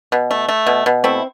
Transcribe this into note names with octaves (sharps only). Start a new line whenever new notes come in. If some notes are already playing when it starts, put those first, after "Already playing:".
B2
A3
A3
B2
B2
A3 C4 E4